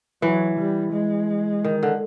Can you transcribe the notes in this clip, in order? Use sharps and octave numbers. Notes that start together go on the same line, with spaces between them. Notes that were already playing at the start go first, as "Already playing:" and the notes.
E3 F#3
G3
G#3
D#3
D3